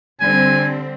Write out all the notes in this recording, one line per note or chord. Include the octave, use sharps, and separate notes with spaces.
D3 G3 C4 G#5